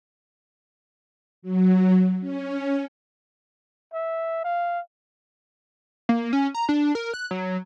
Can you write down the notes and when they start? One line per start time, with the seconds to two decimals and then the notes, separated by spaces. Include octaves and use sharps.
1.42 F#3
2.20 C#4
3.94 E5
4.44 F5
6.09 A#3
6.33 C#4
6.54 A#5
6.69 D4
6.95 A#4
7.14 F#6
7.31 F#3